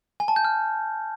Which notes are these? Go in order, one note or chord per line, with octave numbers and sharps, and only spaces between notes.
G#5
A5
G6
F6